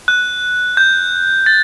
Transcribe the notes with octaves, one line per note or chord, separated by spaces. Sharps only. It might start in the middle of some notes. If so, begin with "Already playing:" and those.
F#6
G6
A6